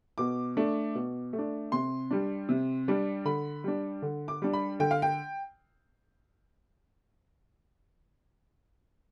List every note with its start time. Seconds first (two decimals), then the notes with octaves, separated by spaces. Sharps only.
0.18 B2 D6
0.57 A3 D4
0.95 B2
1.33 A3
1.38 D4
1.72 C3 C6
2.11 G3 D4
2.49 C3
2.88 G3 D4
3.25 D3 B5
3.64 G3 D4
4.02 D3
4.28 D6
4.42 G3 D4
4.53 B5
4.80 D3 G5
4.91 F5
5.02 G5